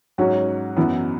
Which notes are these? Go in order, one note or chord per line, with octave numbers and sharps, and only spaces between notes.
G#2 F#3 C#4 F#4
F#2 E3 B3 E4